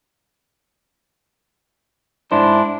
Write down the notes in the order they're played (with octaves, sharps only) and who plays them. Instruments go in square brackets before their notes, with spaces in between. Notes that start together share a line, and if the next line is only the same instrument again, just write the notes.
[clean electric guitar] G#2 E4 C5 [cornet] D4